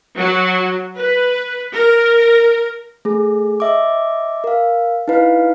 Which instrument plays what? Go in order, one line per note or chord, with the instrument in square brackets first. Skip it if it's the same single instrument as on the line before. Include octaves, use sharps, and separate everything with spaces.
[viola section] F#3
B4
A#4
[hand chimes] A3 G#4
D#5 E5 D6
A#4 F5
D#4 E4 B4 F5